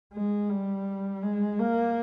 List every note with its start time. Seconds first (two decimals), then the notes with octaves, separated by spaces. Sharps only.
0.13 G#3
0.50 G3
1.23 G#3
1.59 A#3